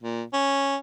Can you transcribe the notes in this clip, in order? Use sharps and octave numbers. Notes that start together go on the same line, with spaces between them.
A#2
C#4